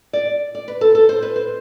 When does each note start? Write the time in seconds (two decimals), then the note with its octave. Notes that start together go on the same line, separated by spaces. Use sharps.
0.13 D5
0.55 D5
0.68 B4
0.81 A4
0.95 A4
1.09 C5
1.22 B4
1.36 C5